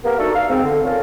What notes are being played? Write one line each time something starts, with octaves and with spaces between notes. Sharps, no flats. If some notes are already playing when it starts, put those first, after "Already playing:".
A#3 B3 G4 A#4
A3 D4 D#4 F#4 A4
F5
G#2 C4
D3
C#4 F4 A4 A#4